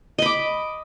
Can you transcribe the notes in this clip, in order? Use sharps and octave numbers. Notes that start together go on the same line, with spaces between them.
D#5 B5 D6